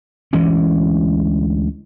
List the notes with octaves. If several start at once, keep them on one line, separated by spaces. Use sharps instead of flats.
D2 E3 G#3 C#4